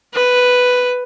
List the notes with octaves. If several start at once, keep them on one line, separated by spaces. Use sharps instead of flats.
B4